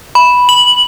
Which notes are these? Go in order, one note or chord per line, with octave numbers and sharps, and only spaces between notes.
B5
F#7